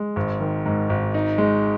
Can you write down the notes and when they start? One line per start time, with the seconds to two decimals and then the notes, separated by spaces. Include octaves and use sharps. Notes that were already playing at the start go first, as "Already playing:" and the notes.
Already playing: G#3
0.16 G#1
0.40 D#3
0.66 G#2
0.89 G#1
1.14 D#4
1.38 G#3